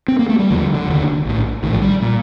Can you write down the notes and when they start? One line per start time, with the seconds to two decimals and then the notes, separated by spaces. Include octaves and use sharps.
0.08 C4
0.19 A#3
0.29 A3
0.39 G3
0.50 F1 D#2 D3 F3
0.75 D3
0.87 F1 D#2 D3
1.25 A#1 A2
1.63 A#1 A2 D#3
1.73 F3
1.82 G3
2.02 A#2